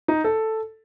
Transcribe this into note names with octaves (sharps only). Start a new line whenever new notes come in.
D#4
A4